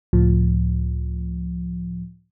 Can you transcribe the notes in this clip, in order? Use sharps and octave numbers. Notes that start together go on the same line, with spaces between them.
C#2 A2 F3